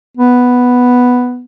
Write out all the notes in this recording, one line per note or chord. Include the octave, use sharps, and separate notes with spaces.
B3